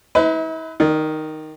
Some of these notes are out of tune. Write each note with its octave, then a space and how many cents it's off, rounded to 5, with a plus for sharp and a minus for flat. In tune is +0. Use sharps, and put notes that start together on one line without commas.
E4 -45 B4 +25 D#5 +35
D#3 +0 D5 +45